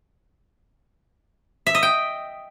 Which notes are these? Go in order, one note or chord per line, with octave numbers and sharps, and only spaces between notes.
E5
D#5
G5